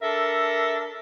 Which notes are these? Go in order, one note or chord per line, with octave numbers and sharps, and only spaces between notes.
D4 A4 A#4 E5